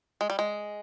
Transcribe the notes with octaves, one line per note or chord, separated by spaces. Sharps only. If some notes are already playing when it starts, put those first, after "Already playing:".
G#3
G3
G#3